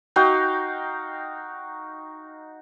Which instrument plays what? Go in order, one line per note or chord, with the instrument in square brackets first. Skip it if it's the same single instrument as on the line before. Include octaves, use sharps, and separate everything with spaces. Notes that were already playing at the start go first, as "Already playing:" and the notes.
[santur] D#4 F#4 F5 G5